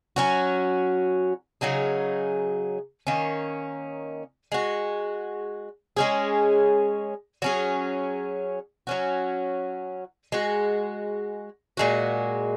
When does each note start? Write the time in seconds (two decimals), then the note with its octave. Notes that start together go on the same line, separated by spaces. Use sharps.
0.16 F#3 C#4 F#4
1.61 C#3 F#3 D#4 G#4
3.07 D#3 A#3 C#4
4.52 G#3 F#4
5.97 G#3 C#4 G#4
7.42 F#3 C#4 G#4
8.87 F#3 C#4 F#4
10.32 G#3 F#4
11.77 A#2 G#3 F#4